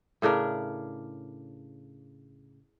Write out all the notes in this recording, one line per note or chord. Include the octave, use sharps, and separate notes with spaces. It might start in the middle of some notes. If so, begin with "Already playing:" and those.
A2 C#3 D4 A#4